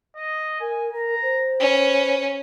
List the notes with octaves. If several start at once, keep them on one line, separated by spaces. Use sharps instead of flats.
D#5
A#4 G#5
A#4 A#5
C5
C#4 B4